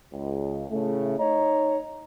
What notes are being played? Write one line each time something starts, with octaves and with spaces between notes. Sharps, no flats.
C#2
A2 C#3 A3
D#4 C#5 D#5 A#5